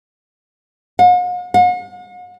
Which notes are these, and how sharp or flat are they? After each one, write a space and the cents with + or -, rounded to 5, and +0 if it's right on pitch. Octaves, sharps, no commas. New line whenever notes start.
F#5 -45
F#5 -45